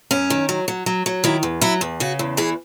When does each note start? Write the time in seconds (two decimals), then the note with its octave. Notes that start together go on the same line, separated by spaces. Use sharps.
0.11 F#2 C#4
0.30 D#3
0.49 F#3
0.68 F#3
0.86 F#3
1.06 F#3
1.24 D#3 E4
1.43 E2
1.61 F#3 E4
1.81 E2
2.00 C#3 F#4
2.19 E2
2.37 E3 G#4